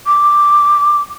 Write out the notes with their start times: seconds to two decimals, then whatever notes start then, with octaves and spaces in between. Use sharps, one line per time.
0.07 D6